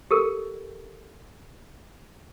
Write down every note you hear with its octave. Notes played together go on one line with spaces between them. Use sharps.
G4 A4 A#4